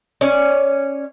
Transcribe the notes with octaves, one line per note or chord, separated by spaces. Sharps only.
C#4 D5